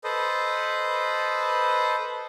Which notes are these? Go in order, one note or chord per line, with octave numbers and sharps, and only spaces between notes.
A4 B4 C5 D#5